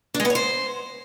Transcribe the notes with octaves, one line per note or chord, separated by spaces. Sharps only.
D4
G#3
B3
C#5
C5